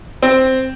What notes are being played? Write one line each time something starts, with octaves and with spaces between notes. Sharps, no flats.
C4